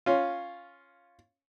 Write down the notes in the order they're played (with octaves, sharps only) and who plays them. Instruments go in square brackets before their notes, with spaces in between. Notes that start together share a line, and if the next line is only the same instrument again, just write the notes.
[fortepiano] C#4 F4